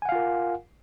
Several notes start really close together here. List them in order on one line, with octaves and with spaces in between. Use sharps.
G#5 F#5 F5 F4 A#4